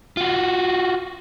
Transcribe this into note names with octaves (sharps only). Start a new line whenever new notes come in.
F4 F#4